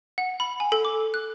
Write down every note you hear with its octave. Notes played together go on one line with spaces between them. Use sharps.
F#5
B5
G#5
A4
D6
F#6